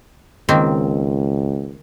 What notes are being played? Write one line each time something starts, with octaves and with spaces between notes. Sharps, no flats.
C#2 D#3 A#3 C4